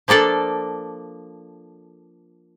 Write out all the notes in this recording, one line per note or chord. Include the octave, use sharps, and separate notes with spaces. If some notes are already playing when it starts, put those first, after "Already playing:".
F3 A#3 D4 A4 D5